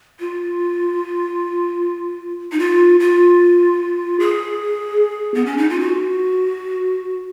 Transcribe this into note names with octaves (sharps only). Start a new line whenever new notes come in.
F4
D#4
F4
F4
G#4
B3
C#4
D#4
F4
F#4